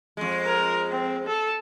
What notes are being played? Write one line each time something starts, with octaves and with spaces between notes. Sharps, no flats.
F2 G#3
A#4
C4
A4